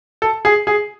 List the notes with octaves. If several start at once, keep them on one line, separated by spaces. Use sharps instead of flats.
A4
G#4
G#4